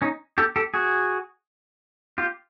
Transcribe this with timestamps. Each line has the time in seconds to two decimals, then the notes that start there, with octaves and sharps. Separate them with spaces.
0.02 C#4 D#4
0.38 G4 A4
0.56 G4 A4
0.74 F#4 G#4
2.18 F4 G4